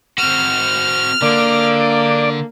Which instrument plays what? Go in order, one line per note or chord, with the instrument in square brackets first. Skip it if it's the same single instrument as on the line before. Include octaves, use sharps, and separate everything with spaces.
[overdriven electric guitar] C4 F#4 [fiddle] F6
[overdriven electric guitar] D3 [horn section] A#3 [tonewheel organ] D5